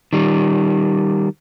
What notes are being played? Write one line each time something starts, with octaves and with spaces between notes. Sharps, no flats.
D#3 G3